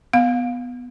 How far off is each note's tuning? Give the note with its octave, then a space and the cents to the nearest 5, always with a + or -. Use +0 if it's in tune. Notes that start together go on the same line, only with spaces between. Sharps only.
B3 +0 F5 +20